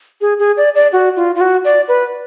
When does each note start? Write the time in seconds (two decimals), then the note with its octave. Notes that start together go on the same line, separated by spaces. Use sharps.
0.21 G#4
0.39 G#4
0.57 D5
0.75 D5
0.93 F#4
1.16 F4
1.35 F4
1.41 F#4
1.65 D5
1.88 B4